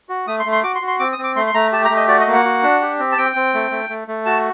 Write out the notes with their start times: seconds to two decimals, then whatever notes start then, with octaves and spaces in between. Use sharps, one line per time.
0.09 F#4
0.27 A3 D#6
0.40 C6
0.45 A3
0.52 C6
0.63 F#4 D6
0.75 C6
0.82 F#4
0.87 C6
0.99 C4 D6
1.13 D#6
1.18 C4
1.23 D6
1.36 A3 C6
1.47 C6
1.54 A3 A#5
1.72 G4 A5
1.85 A#5
1.90 A3
1.96 D#5
2.08 F#4 D5
2.20 D#5
2.27 A#3
2.33 F#5
2.45 F#4
2.63 D4
2.81 G4
2.99 C4
3.12 A5
3.18 C4 G5
3.36 C4
3.54 A3
3.71 A3
3.90 A3
4.08 A3
4.26 F#4 A5